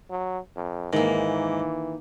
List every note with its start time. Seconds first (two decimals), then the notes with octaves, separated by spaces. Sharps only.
0.11 F#3
0.56 F2
0.93 G#2 D#3 E3 A#3